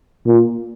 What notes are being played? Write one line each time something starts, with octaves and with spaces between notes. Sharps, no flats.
A#2